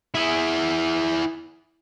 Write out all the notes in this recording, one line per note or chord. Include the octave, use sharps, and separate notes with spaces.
E4 G#4